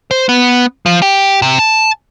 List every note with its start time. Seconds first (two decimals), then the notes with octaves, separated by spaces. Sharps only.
0.11 C5
0.29 B3
0.86 F3
1.02 G4
1.42 C3
1.59 A5